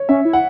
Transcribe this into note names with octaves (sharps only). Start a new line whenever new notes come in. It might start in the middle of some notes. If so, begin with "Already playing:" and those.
Already playing: C#5
C#4 E5
E4
F#5